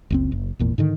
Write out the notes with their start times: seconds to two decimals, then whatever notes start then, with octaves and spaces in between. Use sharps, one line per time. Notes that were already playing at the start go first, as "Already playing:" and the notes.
0.10 F#1 C#2 C4
0.32 F#1
0.59 G#1 E2 A#2
0.78 G#2 D3 D#3